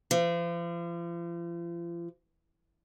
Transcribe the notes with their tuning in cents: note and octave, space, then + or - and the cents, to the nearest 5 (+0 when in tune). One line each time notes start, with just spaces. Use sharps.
F3 -40